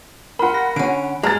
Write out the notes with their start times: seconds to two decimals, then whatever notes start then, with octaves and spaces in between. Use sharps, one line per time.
0.39 F4 A#4 F#5 B5
0.54 A#6
0.76 D3 C#4 D7
1.23 G#3 A#5 F6 A6